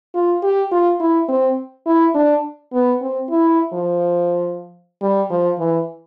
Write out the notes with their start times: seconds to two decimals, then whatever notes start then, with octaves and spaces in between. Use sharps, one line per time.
0.14 F4
0.43 G4
0.72 F4
1.00 E4
1.29 C4
1.86 E4
2.15 D4
2.73 B3
3.01 C4
3.30 E4
3.73 F3
5.02 G3
5.30 F3
5.59 E3